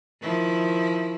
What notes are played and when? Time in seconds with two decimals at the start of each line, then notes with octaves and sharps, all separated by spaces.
0.22 D#3 F3 E4